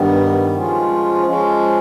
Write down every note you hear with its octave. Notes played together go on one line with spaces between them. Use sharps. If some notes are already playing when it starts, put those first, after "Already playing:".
Already playing: G2 D#3 G3 B3
F3 G#3 C#4 F4
F3 G#3 C#4